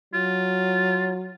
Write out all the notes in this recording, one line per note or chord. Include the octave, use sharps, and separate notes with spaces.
F#3 F4